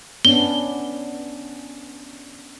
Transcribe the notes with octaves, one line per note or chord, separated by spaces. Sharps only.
B3 C#4 D4 G7